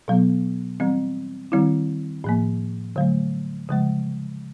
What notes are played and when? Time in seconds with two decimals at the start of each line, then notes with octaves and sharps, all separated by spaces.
0.08 B2 F#3 B3
0.80 E3 G3 C4
1.52 D#3 G3 C4 E4
2.24 A2 F3 A#3
2.96 D3 F#3 A3
3.69 C#3 F3 G#3